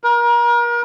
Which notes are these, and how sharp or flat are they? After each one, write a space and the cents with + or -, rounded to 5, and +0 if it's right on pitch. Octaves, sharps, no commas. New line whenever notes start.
A#4 +35